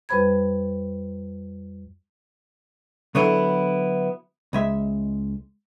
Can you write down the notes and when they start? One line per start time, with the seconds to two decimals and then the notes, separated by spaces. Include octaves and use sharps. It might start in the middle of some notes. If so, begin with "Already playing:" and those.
0.09 F2 G3 B4 C5 B5 G#6
3.15 D3 F#3 B3 D4 E4 A4
4.53 C#2 G#3 E5